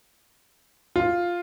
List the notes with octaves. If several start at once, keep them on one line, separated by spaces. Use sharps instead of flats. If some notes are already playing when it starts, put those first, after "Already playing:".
F4